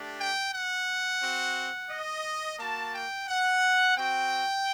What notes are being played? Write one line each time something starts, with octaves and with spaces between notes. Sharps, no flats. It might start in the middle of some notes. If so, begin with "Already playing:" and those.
Already playing: A3 D4 G4
G5
F#5
C4 F#4
D#5
A#3 F#4 A5
G5
F#5
C4 F#4 G5